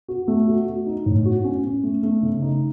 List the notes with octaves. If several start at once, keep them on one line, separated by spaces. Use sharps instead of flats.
F#4
A3
F#4
F#4
D#4
A2
F#4
C#4
C#4
A3
A3
C#3
D#4